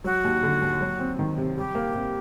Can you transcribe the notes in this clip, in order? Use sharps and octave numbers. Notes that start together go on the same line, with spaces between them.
F#3 F#4
D#2
D3
D#2
F#3
C4
D#3
C3
G3 G4
A#3
C3